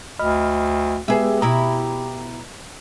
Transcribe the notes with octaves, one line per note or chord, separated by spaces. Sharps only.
D2 D#5 B5 F6
G#3 B3 G4 G#4 B4 E5
B2 E4 A#5